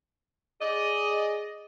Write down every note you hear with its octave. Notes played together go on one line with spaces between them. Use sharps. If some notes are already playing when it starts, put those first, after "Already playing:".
G#4 D5 D#5